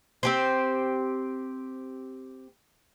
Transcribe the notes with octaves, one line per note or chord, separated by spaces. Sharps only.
C4 G4 C5